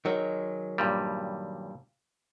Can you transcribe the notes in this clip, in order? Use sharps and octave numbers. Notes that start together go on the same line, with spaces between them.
D#3 F#3 G#3
G2 A#2 G3